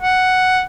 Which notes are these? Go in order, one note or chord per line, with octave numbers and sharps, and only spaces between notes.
F#5